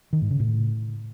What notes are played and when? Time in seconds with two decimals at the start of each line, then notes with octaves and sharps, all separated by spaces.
0.13 D#3
0.22 G#2
0.31 C#3
0.40 A2